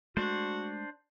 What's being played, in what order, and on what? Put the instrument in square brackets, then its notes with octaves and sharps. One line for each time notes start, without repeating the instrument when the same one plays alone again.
[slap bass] G#3 A3 [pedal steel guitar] D4 C5 [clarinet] F#4